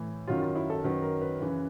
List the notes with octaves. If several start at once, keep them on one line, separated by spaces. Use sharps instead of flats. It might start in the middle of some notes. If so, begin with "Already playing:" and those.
Already playing: A2 E3
F#2 D#3 F#3 F4
F4
E4
A4
F#2 D#3 F#3 B4
A#4
B4
F#2 C#3 E3